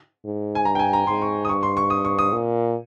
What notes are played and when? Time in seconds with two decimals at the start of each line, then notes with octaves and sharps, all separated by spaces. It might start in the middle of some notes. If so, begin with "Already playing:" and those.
0.24 G#2
0.55 G#5
0.65 G2 A#5
0.75 G5
0.79 G#5
0.93 A#5
1.07 G#2 C6
1.22 C#6
1.45 D#6
1.49 G2 C#6
1.63 C6
1.77 C#6
1.90 D#6
2.05 C#6
2.19 D#6
2.32 A#2